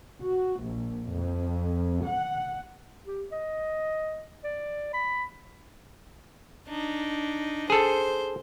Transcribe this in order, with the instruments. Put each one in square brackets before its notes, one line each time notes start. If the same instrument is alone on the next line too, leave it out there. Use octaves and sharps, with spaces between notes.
[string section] F#4
A#1
F2
F#5
[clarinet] G4
D#5
D5
B5
[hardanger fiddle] D4 D#4
[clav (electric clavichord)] G#4 A4 [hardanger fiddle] C5